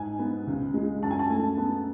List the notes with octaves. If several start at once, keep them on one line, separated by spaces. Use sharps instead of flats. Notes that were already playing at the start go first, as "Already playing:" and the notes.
Already playing: G#2 G#5
B3
C#2
G#3
F#2 A5
G#5
A5
A3
B3